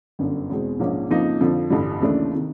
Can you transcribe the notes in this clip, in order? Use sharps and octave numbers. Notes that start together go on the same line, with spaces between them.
G1 F#2 D3
E2 B2 G#3 C4
A#1 G#2 F3 A#3 C#4
F2 C#3 F3 A#3 D#4
F2 D3 F3
A1 G2 D3 G3
D#2 C#3 E3 A3 D4
C3 D#3